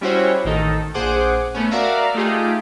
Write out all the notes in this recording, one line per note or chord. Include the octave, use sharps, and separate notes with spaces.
G3 C#4 E4 F#4 C5 C#5
A1 D#3 D#4 A4
A#1 G#4 C5 F#5 D6
A3 B3 C#4
F#4 A#4 D5 E5 F5 A#5
A3 D#4 F4 G4 G#4